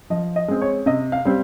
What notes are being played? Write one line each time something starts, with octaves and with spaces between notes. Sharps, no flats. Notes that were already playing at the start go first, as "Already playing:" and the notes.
F3 D#5
D#5
G#3 C4
C#5
C3 D#5
F5
G3 C4